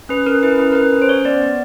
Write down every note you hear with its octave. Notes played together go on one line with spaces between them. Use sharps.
C#4 B4
C#4 A#4
E4 B4
C#4 B4
A#4
C#4 B4
C#4
C5
C#4 C#5
B3 D5
B3